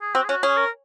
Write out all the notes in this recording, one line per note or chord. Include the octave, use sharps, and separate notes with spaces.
G#4
C4 F#4
G#4
C#4 F#4
C#4 G#4
A#4